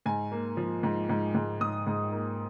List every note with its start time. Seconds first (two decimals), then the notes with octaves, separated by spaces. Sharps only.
0.06 G#2 G#5
0.32 A#3
0.57 F3
0.83 G#2
1.09 G#2
1.35 G#2
1.61 G#2 D#6
1.87 G#2
2.12 A#3